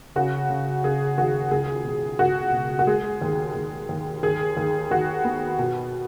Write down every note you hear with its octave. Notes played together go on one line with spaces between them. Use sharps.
C#3 F#4
C#3
C#3 G#4
D#2 F#4
C#2 G#4
B2
C#2 F#4
B2
F#4
G#3 G#4
D#2
D#2
D#2
D#2 G#4
D#2
D#2 F#4
B3
B2